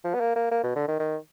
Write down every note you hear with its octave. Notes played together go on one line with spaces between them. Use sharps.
F3
B3
A#3
A#3
A#3
B2
D3
D#3
D#3